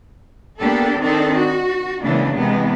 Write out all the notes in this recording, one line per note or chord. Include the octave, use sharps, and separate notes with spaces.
A#3 B3 D4 G4 A4
D#3 C4 D4 D#4 A4
F#4
C#3 E3 G#3 A#3 B3 D4
C3 E3 G#3 B3